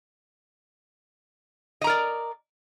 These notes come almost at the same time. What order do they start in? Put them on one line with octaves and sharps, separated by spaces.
D#5 A#5 A#4 D5